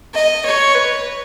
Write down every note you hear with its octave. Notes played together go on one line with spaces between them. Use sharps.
D#5
C#5
B4